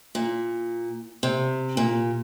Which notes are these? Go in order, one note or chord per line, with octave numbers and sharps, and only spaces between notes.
A#2
C3
A#2